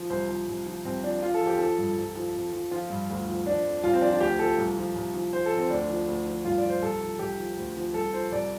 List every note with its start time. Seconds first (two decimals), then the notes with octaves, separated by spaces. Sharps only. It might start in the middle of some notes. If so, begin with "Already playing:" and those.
Already playing: F3
0.10 C2 C5
0.29 F3
0.48 C2
0.66 F3
0.85 C2 C4
1.03 F3 D4
1.22 F3 F4
1.34 A4
1.41 F2
1.47 G4
1.59 F3 A4
1.78 G2
1.97 C2
2.15 F3
2.34 F2
2.53 F3
2.71 F3 F4
2.90 G2
3.09 D2
3.27 F3
3.46 F3 D4
3.65 F2
3.83 C2 F4
3.93 C4
4.02 F3 D4
4.11 F4
4.21 D2 G4
4.39 F3 A4
4.58 C2
4.77 F3
4.95 C2
5.14 F3
5.33 F3 C5
5.46 A4
5.52 F2
5.59 C4
5.70 D2 D4
5.89 F3
6.08 D2
6.26 F3
6.45 G2 F4
6.58 D5
6.64 F3
6.70 C5
6.82 C2 A4
7.01 F3
7.19 C2 G4
7.38 F3
7.57 D2
7.76 F3
7.94 C2 A4
8.13 F3 C5
8.32 C2 D5